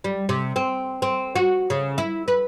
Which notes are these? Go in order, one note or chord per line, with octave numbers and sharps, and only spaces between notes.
G3
C3
C4
C4
F#4
C#3
E4
B4